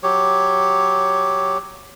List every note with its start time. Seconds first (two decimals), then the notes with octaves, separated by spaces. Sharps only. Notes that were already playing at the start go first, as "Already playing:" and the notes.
0.03 F#3 G4 C#5